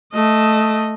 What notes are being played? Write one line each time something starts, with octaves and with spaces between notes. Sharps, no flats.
A3 D#5